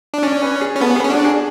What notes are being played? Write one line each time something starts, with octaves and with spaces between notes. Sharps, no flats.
D4
C#4 D5
B4
G#4
C#4
B3 A4
G#4
C#4
D4 F#4
G#4